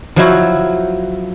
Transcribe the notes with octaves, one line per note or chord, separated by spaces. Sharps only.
F3 F#3 E4 F#4